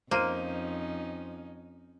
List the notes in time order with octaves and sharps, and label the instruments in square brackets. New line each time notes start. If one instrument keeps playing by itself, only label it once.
[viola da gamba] F2 [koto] A#3 [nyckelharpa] C#4 D#4 [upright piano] C5 F6 D#7